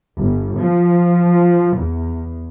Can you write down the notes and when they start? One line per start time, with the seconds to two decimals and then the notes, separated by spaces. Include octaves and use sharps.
0.19 G1
0.61 F3
1.78 E2